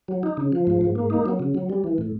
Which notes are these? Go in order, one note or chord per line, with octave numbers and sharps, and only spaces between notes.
F#3
D#4
C#3
F3
G#2
G#2
A#3
D#4
F#3
C#3
F#3
G3
E3
A2